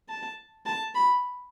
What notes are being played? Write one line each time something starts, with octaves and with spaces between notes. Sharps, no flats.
A5
A5
B5